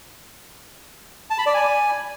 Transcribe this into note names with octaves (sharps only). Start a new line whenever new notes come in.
A5
B5
D5
G#5